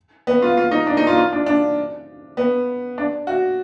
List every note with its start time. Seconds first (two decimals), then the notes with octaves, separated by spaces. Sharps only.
0.27 B3
0.42 F4
0.57 F4
0.71 D#4
0.87 D4
0.97 D#4
1.07 F4
1.18 F4
1.33 D4
1.46 D4
2.37 B3
2.98 D4
3.27 F#4